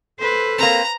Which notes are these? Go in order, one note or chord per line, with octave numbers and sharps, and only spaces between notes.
A4 B4 C5
A#3 C4 A#5